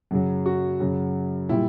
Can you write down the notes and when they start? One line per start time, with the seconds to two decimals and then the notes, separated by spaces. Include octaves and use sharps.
0.11 F#2 C#3 F#3
0.46 F#4
0.80 F#2 C#3 F#3
1.49 A#2 G3 E4